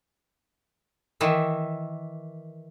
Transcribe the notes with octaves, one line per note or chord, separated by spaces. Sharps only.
D#3 E3 E5